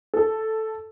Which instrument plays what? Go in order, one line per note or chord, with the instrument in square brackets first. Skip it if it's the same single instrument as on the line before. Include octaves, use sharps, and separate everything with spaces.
[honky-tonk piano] A4